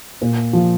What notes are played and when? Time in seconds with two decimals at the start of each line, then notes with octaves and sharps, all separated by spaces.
0.21 A#2
0.53 F3